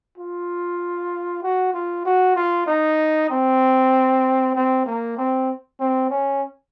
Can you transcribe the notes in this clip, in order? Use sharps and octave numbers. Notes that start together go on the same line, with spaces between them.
F4
F#4
F4
F#4
F4
D#4
C4
C4
A#3
C4
C4
C#4